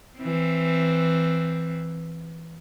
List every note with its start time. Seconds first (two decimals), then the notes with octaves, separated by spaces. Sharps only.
0.18 E3 C4